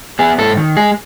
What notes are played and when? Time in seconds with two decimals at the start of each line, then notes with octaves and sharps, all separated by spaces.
0.19 B3 G#4
0.38 G#2 A4
0.57 D#3
0.77 G#3 G#4